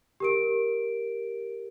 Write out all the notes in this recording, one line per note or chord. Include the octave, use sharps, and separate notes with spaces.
G4 A#4 D7